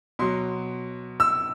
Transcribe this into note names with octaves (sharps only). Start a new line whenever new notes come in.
B2 F#3 C6
E6